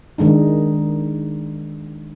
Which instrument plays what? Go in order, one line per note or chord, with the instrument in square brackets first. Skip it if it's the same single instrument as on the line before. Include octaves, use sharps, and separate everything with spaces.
[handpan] D#3 G#3 D4 D#4